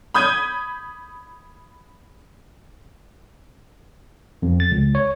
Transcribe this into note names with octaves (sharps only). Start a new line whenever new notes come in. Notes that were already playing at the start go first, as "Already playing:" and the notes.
B5 D#6 G6 G#6 D#7
F2
A6
C#2
C#5